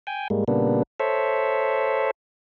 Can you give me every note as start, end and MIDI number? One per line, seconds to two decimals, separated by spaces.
0.07 0.28 79
0.07 0.28 80
0.30 0.44 44
0.30 0.44 55
0.30 0.44 56
0.30 0.44 58
0.48 0.83 46
0.48 0.83 49
0.48 0.83 55
0.48 0.83 58
0.48 0.83 59
0.48 0.83 62
1.00 2.11 69
1.00 2.11 72
1.00 2.11 73
1.00 2.11 76